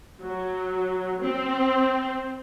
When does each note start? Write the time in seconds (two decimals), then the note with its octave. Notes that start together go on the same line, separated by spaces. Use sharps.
0.21 F#3
1.21 C4